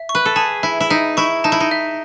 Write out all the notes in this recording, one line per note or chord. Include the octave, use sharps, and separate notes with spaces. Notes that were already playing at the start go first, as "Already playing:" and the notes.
Already playing: E5
C#6
B4
A4
G#4 A5
E4 E5
E4
D#4 E5
E4 C#6
D#4 A5
E4
D#4
E5